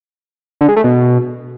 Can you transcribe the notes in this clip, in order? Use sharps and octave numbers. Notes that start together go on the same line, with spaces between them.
D3
G#3
A3
B2